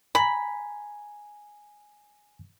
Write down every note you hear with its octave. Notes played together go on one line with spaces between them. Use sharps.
G#5 A#5 B5